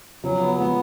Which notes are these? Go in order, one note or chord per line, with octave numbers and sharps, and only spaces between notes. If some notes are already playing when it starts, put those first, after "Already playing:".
C#3 F3 F#3
B3
F3 G#3 B3